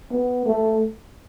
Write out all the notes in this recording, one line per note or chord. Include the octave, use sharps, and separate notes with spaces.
B3
A3